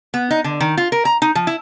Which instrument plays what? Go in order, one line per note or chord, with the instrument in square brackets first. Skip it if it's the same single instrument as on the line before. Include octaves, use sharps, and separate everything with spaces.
[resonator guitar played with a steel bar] B3
D#4
D3
D#3
F4
A#4
A#5
D#4
F3
E4